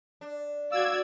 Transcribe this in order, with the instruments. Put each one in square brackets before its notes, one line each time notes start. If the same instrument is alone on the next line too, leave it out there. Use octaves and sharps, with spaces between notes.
[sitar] D4
[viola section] F#4 D5 [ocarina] F5 [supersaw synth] E6 G#6